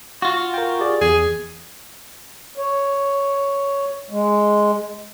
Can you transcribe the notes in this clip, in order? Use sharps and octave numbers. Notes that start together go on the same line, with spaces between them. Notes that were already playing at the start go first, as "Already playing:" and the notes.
F4 F#4
A#4 G5
G4 G#4 D5
E2 G#4
C#5
G#3